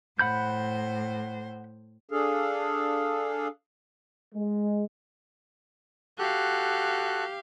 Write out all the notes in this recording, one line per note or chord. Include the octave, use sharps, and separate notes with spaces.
A2 C5 F#5 B5 G6
D4 G#4 A4 F5
G#3
F#4 G4 A4 F5 F#6